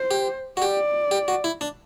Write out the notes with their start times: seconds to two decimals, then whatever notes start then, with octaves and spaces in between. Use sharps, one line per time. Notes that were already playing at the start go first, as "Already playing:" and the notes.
Already playing: C5
0.11 G4
0.57 F#4
0.61 G4 D5
1.11 G4
1.28 F#4
1.44 E4
1.61 D4